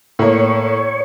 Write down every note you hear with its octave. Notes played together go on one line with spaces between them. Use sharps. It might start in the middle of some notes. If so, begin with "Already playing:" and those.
A2 A#3 C#5